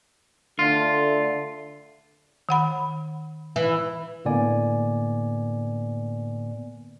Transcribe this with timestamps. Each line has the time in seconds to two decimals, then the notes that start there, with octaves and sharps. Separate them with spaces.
0.59 D3 A3 F4
2.49 D#3 F#5 B5
3.56 E3
4.25 A2 D3 A#3 B3 D5 G#5